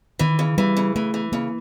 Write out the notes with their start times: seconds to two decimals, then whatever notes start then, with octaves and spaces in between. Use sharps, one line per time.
0.19 D#3 E3
0.39 C#3
0.57 E3 G3
0.77 C#3
0.96 E3 A3
1.14 E3
1.32 C#3 A#3